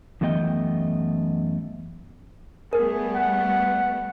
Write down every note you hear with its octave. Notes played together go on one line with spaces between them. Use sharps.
F#2 E3 A3 B3 D#5 G5
G3 A3 B3 G#4 A#4
F#5